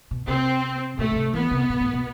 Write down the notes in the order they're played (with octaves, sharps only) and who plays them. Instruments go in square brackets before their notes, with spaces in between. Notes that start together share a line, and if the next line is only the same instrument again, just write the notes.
[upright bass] B2
[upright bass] C3 [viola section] C4
[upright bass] B2 [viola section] A3
[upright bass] D3
C3
[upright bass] E3 [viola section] B3
[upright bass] C3
B2
A2
B2